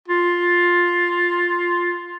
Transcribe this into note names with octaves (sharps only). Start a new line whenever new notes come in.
F4